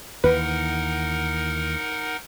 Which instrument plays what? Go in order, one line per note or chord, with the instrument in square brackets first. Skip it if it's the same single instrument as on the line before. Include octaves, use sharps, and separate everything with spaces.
[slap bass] D#2 E3 [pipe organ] D#4 A#4 F#5 [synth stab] B4